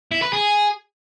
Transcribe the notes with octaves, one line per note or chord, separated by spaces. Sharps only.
E4
B4
G#4